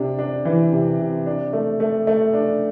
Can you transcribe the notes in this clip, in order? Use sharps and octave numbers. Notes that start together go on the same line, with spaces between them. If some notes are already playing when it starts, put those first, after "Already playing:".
Already playing: C3 D4
D4
E3
C3
C3
D4
A3
A3
A3
D4